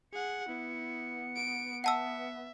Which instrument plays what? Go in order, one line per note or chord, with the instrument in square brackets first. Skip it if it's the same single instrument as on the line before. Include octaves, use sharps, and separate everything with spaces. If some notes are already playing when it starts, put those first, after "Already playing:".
[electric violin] G#4 F#5 [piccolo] C#7
[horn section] B3 [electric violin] E4
[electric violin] D7
[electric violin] E5 [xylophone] F#5 A5 E6